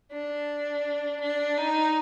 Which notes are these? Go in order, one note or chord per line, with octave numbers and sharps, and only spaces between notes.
D4
D4
D#4